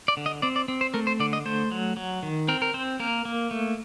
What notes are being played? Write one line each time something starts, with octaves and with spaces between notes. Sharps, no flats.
D5
D3
D#5
C4 D5
D5
C4
C5
A3 A#4
C5
D3 D5
D#5
A3 C5
F#3
F#3
D#3
C4 A#4
A#4
C4 C5
A#3 A#4
A#3
A3